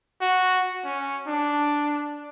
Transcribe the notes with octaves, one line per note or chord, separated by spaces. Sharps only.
F#4
C#4
D4